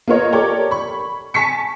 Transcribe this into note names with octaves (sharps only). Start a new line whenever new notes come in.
A#3 B3 F4 C#5 D#5
G4 A4 A#4 C#5 D5
B5 C#6
G#5 A5 C#6 B6 C#7